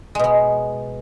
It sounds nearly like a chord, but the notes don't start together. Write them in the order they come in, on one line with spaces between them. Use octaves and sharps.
G#3 B2 B3